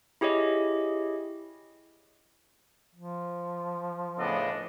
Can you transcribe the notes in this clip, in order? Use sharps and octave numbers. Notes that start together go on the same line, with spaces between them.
E4 G4 G#4 C#5 D#5
F3
A2 C#3 B3 D4 A4 D#5